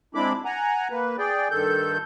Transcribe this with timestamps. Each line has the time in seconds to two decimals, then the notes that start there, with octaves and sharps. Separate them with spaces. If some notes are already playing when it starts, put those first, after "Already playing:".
0.15 G#3 C4 D4 E4 B5 D6
0.45 F#5 G#5 A#5
0.91 A#3 B4
1.18 G#4 D5 G5
1.51 G2 D#3 A4 G6